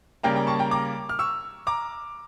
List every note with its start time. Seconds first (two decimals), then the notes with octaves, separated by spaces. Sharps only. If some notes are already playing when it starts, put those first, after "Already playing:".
0.23 C#3 G3 A#3 G5 A#5
0.36 G5 A#5
0.47 A5 C#6
0.59 G5 A#5
0.71 A#5 D6
1.09 F6
1.19 C#6 E6
1.67 A#5 D6